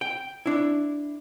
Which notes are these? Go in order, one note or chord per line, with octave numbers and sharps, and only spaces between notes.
G5
D4 E4